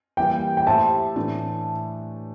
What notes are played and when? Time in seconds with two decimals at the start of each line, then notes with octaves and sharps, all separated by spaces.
0.17 E3 G3 A#3 G5
0.57 G5
0.67 A3 E4 G4 C5 E5 A5
1.16 A2 E3 A3 D4